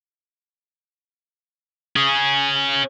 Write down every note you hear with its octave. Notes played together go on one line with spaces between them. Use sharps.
C#4 G#4